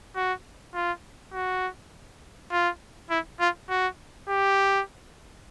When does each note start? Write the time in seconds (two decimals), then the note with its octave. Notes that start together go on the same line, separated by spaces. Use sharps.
0.15 F#4
0.74 F4
1.33 F#4
2.51 F4
3.10 E4
3.40 F4
3.70 F#4
4.29 G4